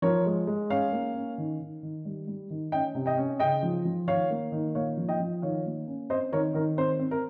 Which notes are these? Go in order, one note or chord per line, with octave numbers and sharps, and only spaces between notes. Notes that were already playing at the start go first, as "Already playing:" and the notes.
F3 A#4 C#5
G#3
G#3
C#4 C#5 F5
A#3
C#4
D#3
D#3
D#3
G3
G3
D#3
C#4 D#5 G5
C3
D#5 G5
C#4
C#3 D#5 G5
F3
F3
D#3 C#5 F5
A#3
D#3
A#2 C#5 F5
F3
D#5 G5
F3
D#3 C#5 F5
A#3
C#4
C4 C5 D#5
D#3 A#4 C#5
D#3 A#4
C4 C5
C4
A#4